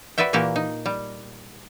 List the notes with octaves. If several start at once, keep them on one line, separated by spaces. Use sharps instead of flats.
F#4 B4 D5 E5 G5
A#2 E3 A#3 F#4 G4
D#4
G3